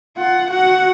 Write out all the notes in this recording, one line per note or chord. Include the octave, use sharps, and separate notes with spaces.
F4 F#5
F#4 F#5